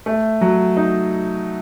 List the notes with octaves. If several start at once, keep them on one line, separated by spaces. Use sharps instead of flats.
A3
F#3
D#4